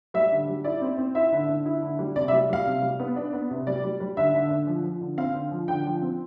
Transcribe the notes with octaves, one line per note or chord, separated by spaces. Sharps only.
G3 E5
D3
G3
E4 D5
C4
C4
E4 E5
D3
D3
E4
D3
G3
C3 D5
E5
G3
G3 F5
C3
G3
B3
D4
B3
C3
G3 D5
G3
G3
D3 E5
D3
D3
F3
F3
D3
C4 F5
D3
F3
D3 G5
F3
C4